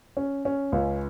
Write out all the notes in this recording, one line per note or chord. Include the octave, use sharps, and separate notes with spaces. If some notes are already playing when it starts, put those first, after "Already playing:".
C#4
C#4
C#2